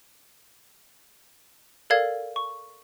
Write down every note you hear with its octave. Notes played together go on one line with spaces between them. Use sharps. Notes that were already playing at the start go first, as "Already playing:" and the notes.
A4 A#4 D5 F5 G#6
C#6